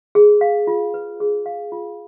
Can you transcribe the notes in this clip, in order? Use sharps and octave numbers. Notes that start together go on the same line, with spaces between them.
G#4
F5
F4
B4
G#4
F5
F4